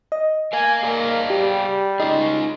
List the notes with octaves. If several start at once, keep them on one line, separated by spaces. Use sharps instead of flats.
D#5
A#4 F5 G#5
A#3 G#4 D5 F5
G3 G4
C#4 D#4 F4 G#4